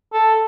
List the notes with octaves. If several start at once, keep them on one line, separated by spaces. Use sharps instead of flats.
A4